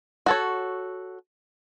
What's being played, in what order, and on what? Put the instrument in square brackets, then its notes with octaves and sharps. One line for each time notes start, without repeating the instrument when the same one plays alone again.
[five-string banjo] F#4 A4 C#5